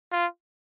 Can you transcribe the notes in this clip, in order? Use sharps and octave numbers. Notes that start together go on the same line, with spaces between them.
F4